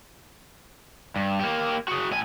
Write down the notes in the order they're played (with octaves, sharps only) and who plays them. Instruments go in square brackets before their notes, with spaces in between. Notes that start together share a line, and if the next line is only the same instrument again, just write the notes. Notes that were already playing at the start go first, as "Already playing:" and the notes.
[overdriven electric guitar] G2
A#3 G4
F#4 G#4
A2 G#5